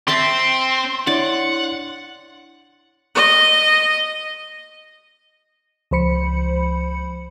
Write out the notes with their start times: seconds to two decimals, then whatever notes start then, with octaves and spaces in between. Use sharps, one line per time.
0.08 C4 E5 G5 A5 C6
1.07 D4 E4 C#5 D5 F#5
3.15 D#5
5.91 C#2 F3 C5 B5 C#7